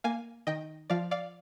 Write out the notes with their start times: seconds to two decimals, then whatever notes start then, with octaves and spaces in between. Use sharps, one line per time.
0.04 A#3 F5 G#5
0.47 D#3 D#5 G5
0.90 F3 D5 F5
1.11 D5 F5